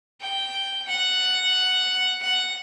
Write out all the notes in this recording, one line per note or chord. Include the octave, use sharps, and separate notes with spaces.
G5
F#5
F#5